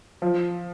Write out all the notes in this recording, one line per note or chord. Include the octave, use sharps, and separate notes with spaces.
F3